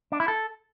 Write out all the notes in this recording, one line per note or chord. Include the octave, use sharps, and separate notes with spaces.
D4
E4
A4